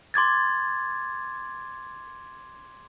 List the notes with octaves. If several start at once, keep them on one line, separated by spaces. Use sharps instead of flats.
C6 D6 G#6 A6